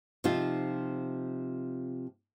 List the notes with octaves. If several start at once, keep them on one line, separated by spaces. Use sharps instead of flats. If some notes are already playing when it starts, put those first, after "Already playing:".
C3 F3 D#4 F4